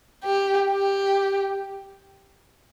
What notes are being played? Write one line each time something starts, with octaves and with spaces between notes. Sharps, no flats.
G4
G4